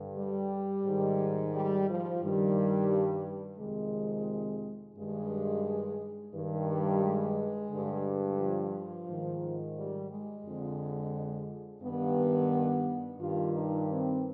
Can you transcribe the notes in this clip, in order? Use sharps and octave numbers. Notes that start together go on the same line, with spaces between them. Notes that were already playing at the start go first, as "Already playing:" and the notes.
Already playing: G2 D3
G3
G#2 D#3
G3
F3
G2 D#3 G3
F2 C3 D#3 G#3
G2 D#3 G#3
G2 D#3
G3
G#3
G2 D3
F3
G#2 D#3
G3
G#3
F2 D3
G2 D#3 B3
G2 D#3 F4
D#4
C4